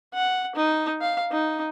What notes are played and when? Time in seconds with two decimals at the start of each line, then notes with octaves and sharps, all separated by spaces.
0.14 F#5
0.55 D#4
1.01 F5
1.31 D#4